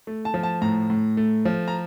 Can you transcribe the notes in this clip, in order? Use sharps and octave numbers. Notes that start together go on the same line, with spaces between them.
A3
A5
F3
A5
A2 A#5
A2
A3
F3
A#5